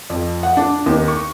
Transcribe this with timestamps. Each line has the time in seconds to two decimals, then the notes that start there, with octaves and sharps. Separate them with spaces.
0.10 F2
0.43 F#5
0.57 D4
0.86 D#2
1.08 C#6